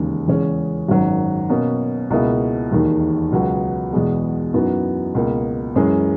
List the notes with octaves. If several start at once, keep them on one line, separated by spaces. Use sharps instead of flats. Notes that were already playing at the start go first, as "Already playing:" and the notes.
Already playing: E1 D#2 C#3 G#3 D#4
E2 C#3 G#3 C#4
G#1 F#2 D#3 F#3
B2 A#3 C#4
C#2 B2 A#3 E4 G#4
E1 D#2 D#3
C#2 B2 F#3 B3 F#4
E2 B2 G#3
F#2 E3 B3 D#4 F#4
C#2 B2 A#3
F#2 E3 G#3 C#4 G#4